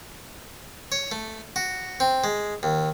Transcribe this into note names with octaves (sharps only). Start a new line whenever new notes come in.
C#5
A3
F#4
C4
G#3
D#2